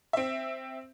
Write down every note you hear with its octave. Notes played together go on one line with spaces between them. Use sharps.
C4 E5